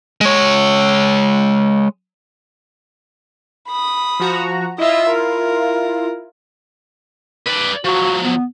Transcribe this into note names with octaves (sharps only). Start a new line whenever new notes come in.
G#3 C#5
B5 D#6
F3 F#4 A#5
E4 F4 D#5 E5
A#4
B4 D5
F3 F#3 F#4
B3